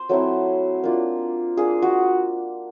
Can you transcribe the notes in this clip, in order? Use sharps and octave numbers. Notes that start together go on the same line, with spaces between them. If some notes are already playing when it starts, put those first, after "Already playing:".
Already playing: C5
F#3 A3 C4 E4
A#3 D4 F4
A#3 D4 F4 G#4
F#4